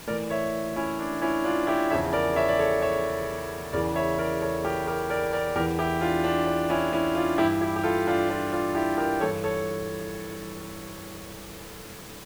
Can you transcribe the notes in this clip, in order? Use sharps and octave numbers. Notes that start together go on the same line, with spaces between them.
A2 E3 A#4 D5
C#5 E5
C#4 E4
D4
C#4 E4
D4 F4
E4 G4
E2 C#3 F3 C#5 E5
A#4 D5
C#5 E5
D5
A4 C#5
C#5 E5
E2 C#3 E3 A#4 D5
C#5 E5
A#4 D5
A4 C#5
G4 A#4
G4 A#4
A#4 D5
A#4 D5
E2 E3 G4 A#4
E4 G4
D4 F4
D4
D4
C#4 E4
C#4 E4
D4 F4
G2 E3 E4 G4
E4 G4
G4
F4 A4
D4 F4
D4 F4
D4 F4
E4 G4
G4 A#4
G2 E3 A4 C#5
A4 C#5